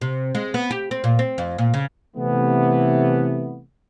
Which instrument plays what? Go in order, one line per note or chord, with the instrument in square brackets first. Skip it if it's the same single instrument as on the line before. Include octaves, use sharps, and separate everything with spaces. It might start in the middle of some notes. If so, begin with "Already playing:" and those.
[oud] C3
G#3
B3
G4
C4
A#2
C4
F2
A#2
C#3
[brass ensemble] C3 E3 A3 B3